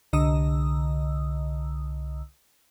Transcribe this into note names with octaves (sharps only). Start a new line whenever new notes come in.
C2 D3 D#5 A#5 D#6 E6